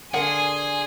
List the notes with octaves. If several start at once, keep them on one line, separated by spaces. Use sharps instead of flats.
D3 D4 G#4 A#4 F5 F#5 G#5 C6